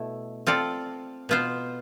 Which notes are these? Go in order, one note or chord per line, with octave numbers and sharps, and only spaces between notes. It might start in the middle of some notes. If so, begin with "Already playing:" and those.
Already playing: B2 A3 E4
C4 F4 A4 D5
B2 B3 F4 C5